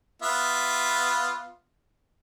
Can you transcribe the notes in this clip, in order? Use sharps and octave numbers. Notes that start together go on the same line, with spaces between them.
B3 F4 E5